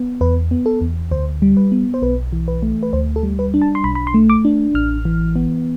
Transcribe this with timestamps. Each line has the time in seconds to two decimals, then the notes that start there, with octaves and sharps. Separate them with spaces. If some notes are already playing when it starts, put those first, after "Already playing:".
Already playing: B3
0.21 E2 B4
0.51 B3
0.66 A4
0.81 E2
1.11 D2 C5
1.42 G3
1.57 B4
1.72 B3
1.94 C5
2.02 B1 B4
2.33 E3
2.48 B4
2.63 A3
2.83 B4
2.93 D2 C5
3.16 A4
3.23 G3
3.39 B4
3.54 D4
3.62 A5
3.75 C6
3.84 B1 B5
3.95 B5
4.07 C6
4.14 A3
4.30 D6
4.45 D4
4.74 A1 F6
5.05 E3
5.36 B3